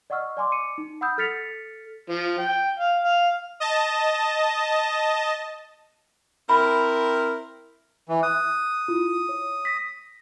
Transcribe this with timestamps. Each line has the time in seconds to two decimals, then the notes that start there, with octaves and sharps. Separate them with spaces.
0.10 D5 D#5 F#5 C#6 E6 F6
0.37 D5 G#5 C6 D6
0.52 D6 C#7 D#7
0.78 D#4
1.01 F#5 B5 D#6 E6 G6
1.18 A4 F6 A6 B6 C#7 F7
2.09 F3
2.38 G5
2.79 F5
3.04 F5
3.60 D#5 A5
6.49 C4 E4 A#4 B5
8.09 E3
8.23 D#6 F#6
8.88 E4 F4
9.29 C#5
9.65 A#6 B6